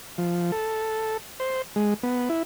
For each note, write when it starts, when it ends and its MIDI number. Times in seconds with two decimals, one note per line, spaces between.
0.18 0.51 53
0.52 1.17 69
1.40 1.62 72
1.76 1.94 56
2.03 2.29 59
2.29 2.43 64